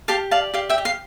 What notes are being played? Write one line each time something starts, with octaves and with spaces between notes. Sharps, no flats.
G4 F5 A5
D5 F5 A5
G4 F5
E5 G5
G4
F5